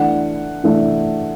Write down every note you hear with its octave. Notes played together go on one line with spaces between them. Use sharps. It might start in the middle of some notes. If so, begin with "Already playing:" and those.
Already playing: E3 A3 D4 F#5
E3 A3 D4